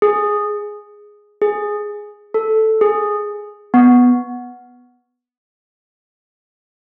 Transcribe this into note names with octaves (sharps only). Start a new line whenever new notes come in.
G#4
G#4
A4
G#4
B3